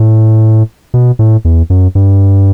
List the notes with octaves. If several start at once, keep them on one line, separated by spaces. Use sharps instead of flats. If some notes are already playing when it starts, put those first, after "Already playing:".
Already playing: A2
B2
A2
E2
F#2
G2